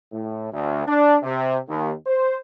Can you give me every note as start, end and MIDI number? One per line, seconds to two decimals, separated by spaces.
0.12 0.48 45
0.53 0.85 38
0.86 1.17 62
1.23 1.57 48
1.68 1.92 39
2.06 2.36 72